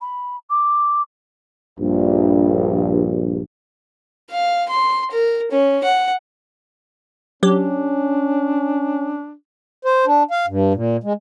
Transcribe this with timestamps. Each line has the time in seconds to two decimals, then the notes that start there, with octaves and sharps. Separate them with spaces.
0.01 B5
0.50 D6
1.80 A#1 G2
4.31 F5
4.69 C6
5.11 A#4
5.51 C#4
5.84 F#5
7.43 F#3 C#4 D4 G4
9.85 C5
10.06 D4
10.31 F5
10.47 G2
10.74 A#2
11.04 G#3